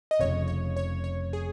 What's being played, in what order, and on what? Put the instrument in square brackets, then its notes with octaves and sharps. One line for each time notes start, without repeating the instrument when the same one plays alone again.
[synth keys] D#5
[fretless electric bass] F1 F2 C#3 [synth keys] C#5
[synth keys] C#5
C#5
C#5
G#4